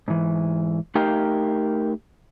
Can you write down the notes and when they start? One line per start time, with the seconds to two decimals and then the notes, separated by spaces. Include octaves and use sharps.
0.08 G#2 E3
0.95 A3 D#4 G4 A#4 F5 G5